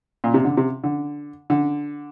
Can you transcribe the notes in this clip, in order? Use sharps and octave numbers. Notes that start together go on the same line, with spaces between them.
A#2
C3
D3
C3
D3
D3